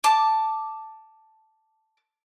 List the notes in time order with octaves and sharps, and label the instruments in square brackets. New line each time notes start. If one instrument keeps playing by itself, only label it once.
[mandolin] A5 D6